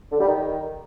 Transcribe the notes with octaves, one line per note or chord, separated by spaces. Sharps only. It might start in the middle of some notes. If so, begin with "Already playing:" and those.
D3
G3
D#3